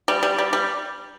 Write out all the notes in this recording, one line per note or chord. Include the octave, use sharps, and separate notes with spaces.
G3
G3
G3
G3